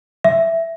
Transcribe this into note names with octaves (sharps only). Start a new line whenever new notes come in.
E5